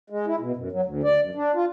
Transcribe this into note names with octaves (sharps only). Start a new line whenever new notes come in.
G#3
E4
B2
F#2
F#3
D2
D5
F#2
D4
F4